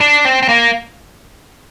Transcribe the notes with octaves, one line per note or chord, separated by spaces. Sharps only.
D4
C4
C4
A#3